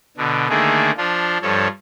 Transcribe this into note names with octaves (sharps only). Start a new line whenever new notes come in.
B2 D3
D3 D#3 A3 A#3 G#4
F3 D4 F4
G2 F3 A4 C#5